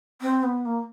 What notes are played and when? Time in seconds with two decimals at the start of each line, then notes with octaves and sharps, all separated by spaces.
0.21 C4
0.43 B3
0.65 A#3